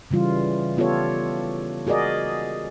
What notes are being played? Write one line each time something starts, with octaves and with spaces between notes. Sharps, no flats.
C#3 E3 G3 F4
B3 F4 G4 A4 C#5
F#4 G#4 A#4 D5 D#5